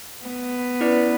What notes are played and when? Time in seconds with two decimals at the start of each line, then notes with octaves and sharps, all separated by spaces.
0.25 B3
0.81 C#4 E4 B4 D5